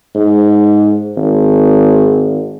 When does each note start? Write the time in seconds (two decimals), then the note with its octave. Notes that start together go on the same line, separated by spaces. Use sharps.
0.15 G#2
1.17 G#1